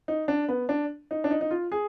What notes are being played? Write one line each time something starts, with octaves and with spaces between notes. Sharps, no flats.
D#4
D4
B3
D4
D#4
D4
D#4
D#4
F4
G#4